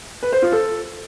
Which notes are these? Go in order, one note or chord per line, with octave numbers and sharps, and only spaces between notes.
B4
C5
F4
A4